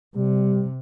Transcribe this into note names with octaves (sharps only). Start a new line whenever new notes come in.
C3 G3